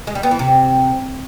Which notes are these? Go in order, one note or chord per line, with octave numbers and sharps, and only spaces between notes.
G#3
G3
B3
E3
C3